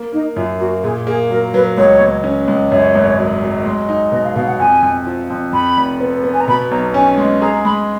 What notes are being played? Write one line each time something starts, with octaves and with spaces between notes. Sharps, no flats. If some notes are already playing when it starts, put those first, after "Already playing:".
Already playing: A#3
A#3 D#4
F#2 F4
A#3 F#4
A#2 G#4
A#3 G#4
F#3 A#4
F#3 B4
C#2 C#5
C#2
C#4
C#2
F#2 C#5
G#1
F#3
F#3
G#3
D#4
B2 D#5
F5
B2 F5
F#5
F2 G#5
F2
F3
F2
F2 B5
F1
B3
B3
G#5
A#5
B2 B5
B1 A#5
C#4 G#5
G#3
G#4 A#5
G#3 B5